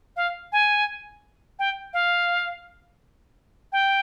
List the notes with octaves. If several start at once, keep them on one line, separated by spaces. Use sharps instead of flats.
F5
G#5
G5
F5
G5